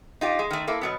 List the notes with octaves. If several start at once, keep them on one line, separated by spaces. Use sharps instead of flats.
D#4 F4 G4
G#3
D#3 A3
A#3 E4 A4
B2 F#3 B3